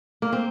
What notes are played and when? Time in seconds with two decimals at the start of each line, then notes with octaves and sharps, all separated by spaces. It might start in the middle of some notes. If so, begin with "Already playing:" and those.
0.22 A#3
0.33 C4